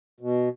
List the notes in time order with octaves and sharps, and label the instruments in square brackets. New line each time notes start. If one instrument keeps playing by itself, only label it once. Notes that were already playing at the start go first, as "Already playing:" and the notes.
[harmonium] B2